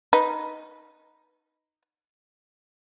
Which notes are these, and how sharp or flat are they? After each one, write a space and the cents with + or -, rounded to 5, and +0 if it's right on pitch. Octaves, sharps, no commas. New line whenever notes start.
D#4 +0 B4 +0